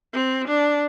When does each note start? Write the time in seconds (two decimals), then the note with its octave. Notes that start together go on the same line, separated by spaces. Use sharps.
0.13 C4
0.48 D4